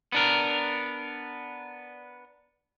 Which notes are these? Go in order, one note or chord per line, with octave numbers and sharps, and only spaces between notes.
B3 D4 A#4